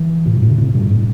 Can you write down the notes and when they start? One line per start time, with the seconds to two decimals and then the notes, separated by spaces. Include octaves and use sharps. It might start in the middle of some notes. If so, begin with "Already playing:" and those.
Already playing: E3
0.25 A2 C3
0.33 G2 B2
0.42 A2 C3
0.49 B2 D3
0.58 A2 C3
0.74 G2 B2
0.91 A2